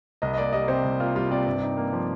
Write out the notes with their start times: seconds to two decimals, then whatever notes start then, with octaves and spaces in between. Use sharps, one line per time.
0.22 C2 D#5
0.34 D#5
0.38 A#3 D5
0.53 G3 D#5
0.68 C3 C5
0.84 C2
1.00 A#3 F4
1.15 G3 F4
1.31 C3 D5
1.46 G2
1.62 D#4
1.77 A#3
1.93 F3